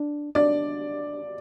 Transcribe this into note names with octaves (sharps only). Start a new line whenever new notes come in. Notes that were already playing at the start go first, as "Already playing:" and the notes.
Already playing: D4
D4 D5